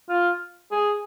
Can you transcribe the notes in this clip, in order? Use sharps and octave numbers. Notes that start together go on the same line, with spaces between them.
F4
G#4